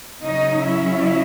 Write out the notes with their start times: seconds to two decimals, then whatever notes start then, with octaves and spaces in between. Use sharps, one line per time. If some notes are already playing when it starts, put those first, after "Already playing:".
0.23 C#3 F#3 C#4 D#4 D#5
0.65 E4 E5